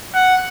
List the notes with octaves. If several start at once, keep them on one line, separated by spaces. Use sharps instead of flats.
F#5